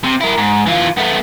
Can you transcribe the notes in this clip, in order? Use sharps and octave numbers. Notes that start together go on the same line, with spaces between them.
C3
E4 A#4
G#2
E3 F4
A3 B3